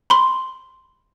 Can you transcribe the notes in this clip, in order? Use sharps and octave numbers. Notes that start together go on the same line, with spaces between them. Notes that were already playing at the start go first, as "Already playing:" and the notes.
B5 C6